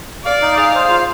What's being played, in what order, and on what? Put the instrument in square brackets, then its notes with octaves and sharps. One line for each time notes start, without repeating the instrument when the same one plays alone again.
[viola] D5 [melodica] F5
[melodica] D#4
[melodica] G#4 [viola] F5
[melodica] C5
F4